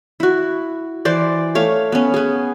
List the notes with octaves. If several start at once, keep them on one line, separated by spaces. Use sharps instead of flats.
E4 F#4
E3 C5 D5
A3 C#5 F5
B3 C#4
B3 G#4